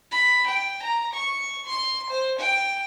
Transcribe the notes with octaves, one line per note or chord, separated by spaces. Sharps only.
B5
G5
A#5
C#6
C6
C5
G5